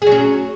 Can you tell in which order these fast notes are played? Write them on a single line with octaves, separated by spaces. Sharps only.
G#4 F#3 C#4